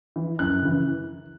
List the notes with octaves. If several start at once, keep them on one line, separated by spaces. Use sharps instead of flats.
E3
F#2 F#6
C#3 E3